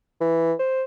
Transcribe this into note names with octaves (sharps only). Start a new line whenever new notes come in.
E3
C5